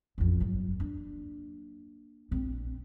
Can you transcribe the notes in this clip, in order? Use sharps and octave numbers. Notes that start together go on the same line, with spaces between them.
A1 F2
G1 F#3
A#3 D4
A#1 C4